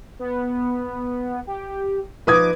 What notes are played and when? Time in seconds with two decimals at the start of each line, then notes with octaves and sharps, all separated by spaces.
0.19 B3
1.47 G4
2.27 F3 D#4 B4 D6 D#6 G#6